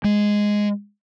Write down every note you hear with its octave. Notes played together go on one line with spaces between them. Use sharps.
G#3